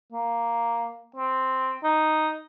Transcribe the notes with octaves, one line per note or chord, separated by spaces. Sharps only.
A#3
C4
D#4